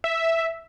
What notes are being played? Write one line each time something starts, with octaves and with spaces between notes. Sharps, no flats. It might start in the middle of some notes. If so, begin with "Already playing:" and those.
E5